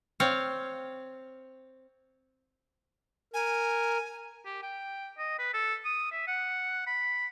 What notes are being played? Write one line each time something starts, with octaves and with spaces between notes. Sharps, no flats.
C4 C#5 F5
A#4 G#5
G4
G5
D#5
B4
A4
D#6
E5
F#5
B5